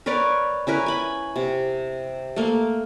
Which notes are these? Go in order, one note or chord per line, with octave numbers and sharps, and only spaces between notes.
A#4 B4 C#5 D5
C#4 E4 A#4 B4
G#5 B5
C3
A3 A#3